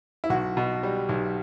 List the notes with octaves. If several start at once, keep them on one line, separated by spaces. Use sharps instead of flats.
E4
B1 F#4
B2
G3
B1